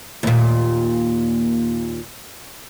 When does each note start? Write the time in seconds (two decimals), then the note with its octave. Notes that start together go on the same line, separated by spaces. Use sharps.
0.23 D#2 A#2